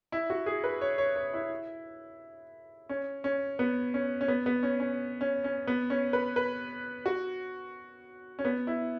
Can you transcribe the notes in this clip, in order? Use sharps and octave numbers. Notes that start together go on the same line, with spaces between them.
E4
F#4
G#4
B4
C#5
C#5
C#5
E4
C#4
C#4
B3
C#4
C#4
B3
B3
C#4
C#4
C#4
C#4
B3
C#4
B4
B4
F#4
C#4
B3
E4